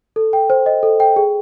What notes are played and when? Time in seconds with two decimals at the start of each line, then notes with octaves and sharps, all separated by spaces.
0.16 A4
0.33 G5
0.50 C5
0.66 D#5
0.83 A4
1.00 G5
1.16 G#4